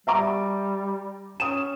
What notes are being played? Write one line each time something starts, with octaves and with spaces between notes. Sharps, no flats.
G3 E5 A#5 D6
C#4 D#6 E7